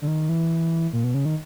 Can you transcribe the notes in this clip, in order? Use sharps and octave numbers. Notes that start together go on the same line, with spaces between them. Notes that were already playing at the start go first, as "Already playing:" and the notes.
D3
D#3
E3
A#2
B2
C#3
D#3